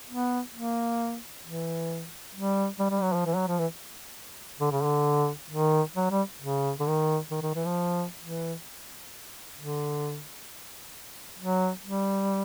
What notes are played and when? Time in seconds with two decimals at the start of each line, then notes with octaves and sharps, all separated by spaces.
0.09 B3
0.54 A#3
1.44 E3
2.35 G3
2.79 G3
2.91 G3
3.02 F#3
3.13 F3
3.26 E3
3.36 F#3
3.48 F3
3.59 E3
4.61 D3
4.72 C#3
4.83 D3
5.50 D#3
5.96 F#3
6.12 G3
6.41 C#3
6.80 D3
6.87 D#3
7.31 D#3
7.43 D#3
7.55 E3
7.66 F3
8.22 E3
9.58 D3
11.39 F#3
11.84 G3